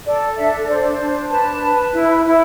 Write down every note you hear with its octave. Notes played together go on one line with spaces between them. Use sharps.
A4 D5
D4 E5
C5 D5
D4
B4 A5
B4
E4
E4